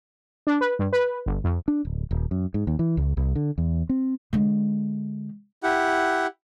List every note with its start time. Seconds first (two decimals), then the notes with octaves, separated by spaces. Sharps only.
0.47 D4
0.61 B4
0.79 G2
0.93 B4
1.26 G1
1.44 F2
1.68 D4
1.85 D1
2.11 D#1
2.31 F#2
2.54 G#2
2.67 D#2
2.79 E3
2.97 C#2
3.17 C2
3.35 D3
3.58 E2
3.89 C4
4.33 D3 G#3
5.63 E4 G4 F#5